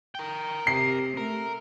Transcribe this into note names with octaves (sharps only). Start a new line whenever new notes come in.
A#4 G5
C3 C7
A3 A#4